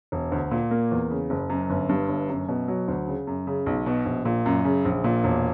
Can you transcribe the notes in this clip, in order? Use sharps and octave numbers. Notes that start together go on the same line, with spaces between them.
E1
D2
A#2
A#3
E2
C#3
F#1
F#2
G1
G2
G1
F#2
B2
F#3
D2
C#3
F#2
C#3
B1
B2
A#1
A#2
F#2
C#3
A#1
A#2
E1